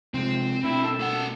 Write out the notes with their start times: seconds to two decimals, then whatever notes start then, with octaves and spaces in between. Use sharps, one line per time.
0.14 C3 F3 G#3 C4
0.64 B2 A3 D4 E4
0.84 A4
0.99 A#3 F#5